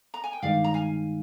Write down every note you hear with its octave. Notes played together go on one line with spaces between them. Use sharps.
A#5
G#5
G5
G2 D#3 G#3 D#4 D5 F5
A#5
F5 G#5